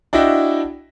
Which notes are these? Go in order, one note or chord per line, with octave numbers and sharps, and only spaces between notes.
D4 E4 F#4 D#5 E5 G5